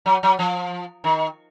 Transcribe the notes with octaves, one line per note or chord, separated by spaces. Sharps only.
F#3
F#3
F3
D#3